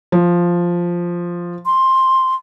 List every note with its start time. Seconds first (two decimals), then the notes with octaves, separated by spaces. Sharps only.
0.12 F3
1.66 C6